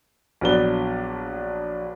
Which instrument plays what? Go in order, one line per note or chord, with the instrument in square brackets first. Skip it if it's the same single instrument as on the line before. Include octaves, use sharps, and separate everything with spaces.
[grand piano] A#1 F#3 B3 D4 G7